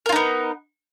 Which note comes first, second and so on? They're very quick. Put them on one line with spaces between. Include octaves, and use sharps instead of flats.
A#4 F4 D#4 B3